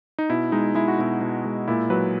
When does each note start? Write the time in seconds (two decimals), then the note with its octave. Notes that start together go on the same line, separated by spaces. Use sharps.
0.18 D#4
0.30 B2 E4
0.52 G#3 D#4
0.75 G#3 E4
0.88 F#4
0.99 B2 E4
1.21 B2
1.45 G#3
1.68 A#2 E4
1.90 F#3 B4